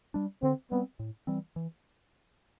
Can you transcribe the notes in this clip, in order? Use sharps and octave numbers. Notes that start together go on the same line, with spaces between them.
G3 D4
D3 C4
G3 B3 C4
A2
E3 G3 C4
E3